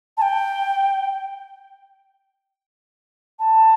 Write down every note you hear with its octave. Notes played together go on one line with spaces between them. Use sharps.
A5
G5
A5